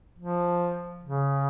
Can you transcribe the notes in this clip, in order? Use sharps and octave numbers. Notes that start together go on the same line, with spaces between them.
F3
C#3